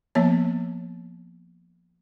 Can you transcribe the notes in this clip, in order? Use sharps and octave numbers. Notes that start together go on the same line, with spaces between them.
F3 A#3 B3 C#5